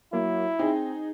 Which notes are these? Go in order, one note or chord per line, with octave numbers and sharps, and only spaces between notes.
F#3 A#3 E4
C4 D#4 G#4